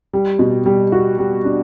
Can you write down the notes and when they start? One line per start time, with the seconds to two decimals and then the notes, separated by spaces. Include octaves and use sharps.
0.13 G3
0.39 B2
0.66 G3
0.92 F#4
1.19 G3
1.44 D4